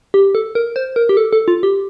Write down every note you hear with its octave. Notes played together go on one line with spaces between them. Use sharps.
G4
A4
A#4
C5
A#4
G4
A4
A4
F4
G4